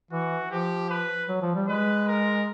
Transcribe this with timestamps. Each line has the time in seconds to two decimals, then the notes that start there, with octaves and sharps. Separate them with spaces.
0.11 E3 F#4
0.50 F3 G4
0.90 B4
1.28 F#3
1.42 F3
1.55 G3
1.68 G#3 B4
2.08 A#4